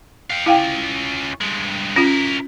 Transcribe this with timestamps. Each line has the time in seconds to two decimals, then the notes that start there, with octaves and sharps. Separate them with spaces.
0.30 F5 G5
0.46 C#4 E4 F4 F5 G5
1.41 G2 G#3
1.96 C#4 E4 F4 A#4